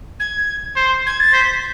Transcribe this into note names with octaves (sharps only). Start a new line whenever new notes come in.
G#6
C5
G#6
A6
C5 B6